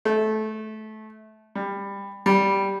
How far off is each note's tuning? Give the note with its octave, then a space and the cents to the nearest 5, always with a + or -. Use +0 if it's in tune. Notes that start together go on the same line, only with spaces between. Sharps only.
A3 -20
G3 +20
G3 +0